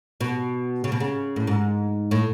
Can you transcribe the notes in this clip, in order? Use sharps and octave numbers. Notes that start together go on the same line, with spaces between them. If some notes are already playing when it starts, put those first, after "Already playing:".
B2
C#3
B2
C#3
A2
G#2
A2